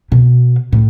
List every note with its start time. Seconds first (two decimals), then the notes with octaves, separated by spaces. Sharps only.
0.12 B2
0.73 A2